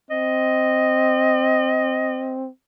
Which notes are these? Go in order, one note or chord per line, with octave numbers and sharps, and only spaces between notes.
C4 D#5